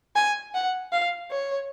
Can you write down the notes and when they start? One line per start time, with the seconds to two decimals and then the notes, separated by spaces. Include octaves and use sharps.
0.15 G#5
0.54 F#5
0.92 F5
1.31 C#5